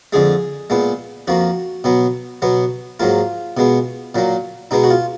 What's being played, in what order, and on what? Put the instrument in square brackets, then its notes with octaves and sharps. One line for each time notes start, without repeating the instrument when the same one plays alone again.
[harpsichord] F2 D3 G#3 G#4
A#2 G#3 B3
F2 F3 A#3 F#4
B2 F#3 B3
B2 F#3 B3
G#2 F#3 A#3 F4
B2 G#3 B3
A#2 F#3 A#3
B2 G#3 B3 D#4
F#4
F4